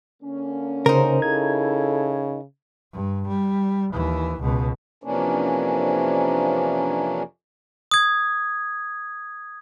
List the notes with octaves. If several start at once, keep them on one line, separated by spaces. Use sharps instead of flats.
D3 A#3 C#4
C#3 D#4 A#4 C5
C#3 E4 A4 G#6
G2
G3
D#2 E3
C#2 B2
F2 C3 E3 A#3 C#4 D4
D#6 G#6